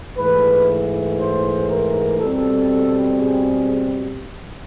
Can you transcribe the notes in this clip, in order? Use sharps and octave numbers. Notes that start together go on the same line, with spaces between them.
G#2 E3 A3 B4
C5
A#4
B2 G3 C4 A4
G#4